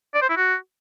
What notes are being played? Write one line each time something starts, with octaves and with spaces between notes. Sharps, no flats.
D5
C5
E4
F#4